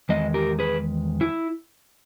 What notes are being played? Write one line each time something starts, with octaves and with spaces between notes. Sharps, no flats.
E2 D#3 G#3 D#5
G4 A#4
G#4 B4
E4